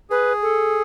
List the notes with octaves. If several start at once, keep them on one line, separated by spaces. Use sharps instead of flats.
G#4 B4
A4